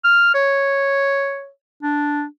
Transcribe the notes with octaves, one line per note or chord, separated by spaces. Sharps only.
F6
C#5
D4